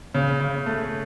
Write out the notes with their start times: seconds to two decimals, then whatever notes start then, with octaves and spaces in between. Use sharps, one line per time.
0.14 C#3
0.40 C#3
0.66 A3